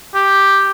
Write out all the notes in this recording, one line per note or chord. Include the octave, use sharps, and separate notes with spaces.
G4